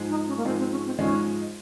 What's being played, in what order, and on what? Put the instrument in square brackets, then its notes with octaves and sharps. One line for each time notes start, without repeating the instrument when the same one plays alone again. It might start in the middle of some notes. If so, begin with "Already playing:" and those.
Already playing: [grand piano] G#2 F3 G#3
[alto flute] D#4
C#4
A#3
[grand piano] G#2 F3 G#3 [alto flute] C4
[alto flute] C4
C#4
C4
[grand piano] G#2 F3 G#3 D#4 [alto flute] C#4